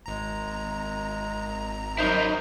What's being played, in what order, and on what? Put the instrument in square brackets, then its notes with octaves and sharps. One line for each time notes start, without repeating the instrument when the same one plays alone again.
[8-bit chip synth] G#1 A#5 [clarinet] G#3
[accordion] F#2 D#4 [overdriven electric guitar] E4 A#4 [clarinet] C5